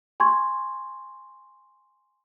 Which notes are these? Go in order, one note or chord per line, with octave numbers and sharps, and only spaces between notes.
G#5 C6 C#6 G#6